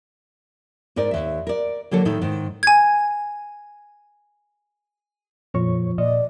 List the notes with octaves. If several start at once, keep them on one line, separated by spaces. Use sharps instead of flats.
G#2 D#4 A#4 D5
D#2 E5
A#4 D5
D3 F#3 A#3 A4 C#5
A2 D#3 D#4 A4
G#2 D#3
G#5 G#6
F2 A#2 F3 C#5 C#6
A#2 D5 D#5